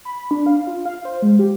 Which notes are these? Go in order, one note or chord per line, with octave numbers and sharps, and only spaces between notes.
B5
D4
F5
F4
F5
C5
G#3
G4